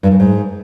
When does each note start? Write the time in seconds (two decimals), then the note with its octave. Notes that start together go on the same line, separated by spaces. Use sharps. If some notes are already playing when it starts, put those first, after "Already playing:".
0.03 G2
0.11 F#2
0.20 G#2